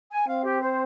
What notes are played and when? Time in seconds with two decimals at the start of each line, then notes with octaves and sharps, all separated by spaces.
0.10 G#5
0.28 C4 F5
0.44 G4
0.61 C5